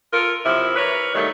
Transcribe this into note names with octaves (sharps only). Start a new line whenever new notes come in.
F4 A4 A#4
C3 F3 F#3 E4
A#4 B4 C#5
D#3 F#3 G3 A3